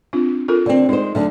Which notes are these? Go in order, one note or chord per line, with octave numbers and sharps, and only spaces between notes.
C4 D4 F4
F4 A4 A#4
D3 C4
G#3 D#4 C5
D2 D3 F#3